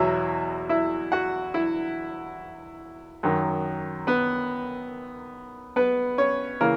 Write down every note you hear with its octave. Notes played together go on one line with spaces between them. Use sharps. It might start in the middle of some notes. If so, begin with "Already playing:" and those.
Already playing: E2 B2 F#3 E4 E5
E4 E5
F#4 F#5
E4 E5
F#2 D#3 F#3
B3 B4
B3 B4
C#4 C#5
C#3 E3 A#3 A#4